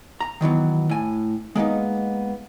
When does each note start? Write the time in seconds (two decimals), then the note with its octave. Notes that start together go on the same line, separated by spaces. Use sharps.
0.21 A#5
0.41 D#3 E3 F#3 B3
0.89 A2 G#5
1.55 G#3 A#3 B3 D#4